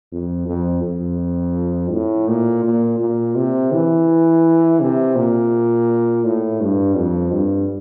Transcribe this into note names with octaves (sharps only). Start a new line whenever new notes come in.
F2
F2
F2
A2
A#2
A#2
A#2
C3
E3
C3
A#2
A2
G2
F2
G2